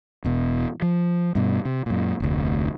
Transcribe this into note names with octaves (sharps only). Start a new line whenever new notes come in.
E1 B2
F3
G2 B2
C3
F#2 A#2
F1 D2